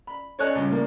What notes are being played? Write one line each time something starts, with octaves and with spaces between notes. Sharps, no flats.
B5
C#4 A4 C#5 D#5 G#5 F#6
C#2 G2
A2 A#3 D4